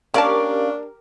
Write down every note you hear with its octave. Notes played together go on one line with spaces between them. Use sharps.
A#3 C#4 D4 G4 A#4 D5 F5 A5